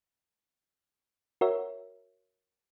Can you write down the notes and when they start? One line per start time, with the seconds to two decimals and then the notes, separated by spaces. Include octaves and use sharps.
1.41 F#4 A#4 C#5 E5